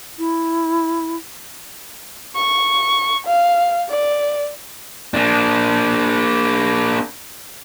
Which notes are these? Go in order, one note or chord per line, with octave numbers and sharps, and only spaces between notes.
E4
C#6
F5
D5
A#3 D4